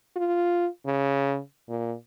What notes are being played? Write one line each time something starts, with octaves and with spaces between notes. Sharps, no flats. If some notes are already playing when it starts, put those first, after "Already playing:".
F4
C#3
A#2